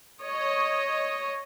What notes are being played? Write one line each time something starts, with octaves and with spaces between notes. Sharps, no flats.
C#5 D#5